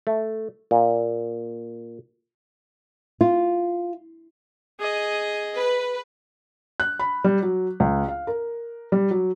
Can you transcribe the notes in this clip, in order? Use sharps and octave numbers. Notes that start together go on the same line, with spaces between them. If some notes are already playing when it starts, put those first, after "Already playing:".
A3
A#2
F4
G#4 D#5
B4
F#6
B5
G3
F#3
C#2
F5
A#4
G3
F#3